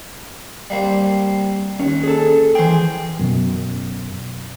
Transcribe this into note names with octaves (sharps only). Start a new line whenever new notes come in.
G3 A#3 C4
D#2 C#4
G#4 A4
E3 G#4 C5 G5
F#2 B2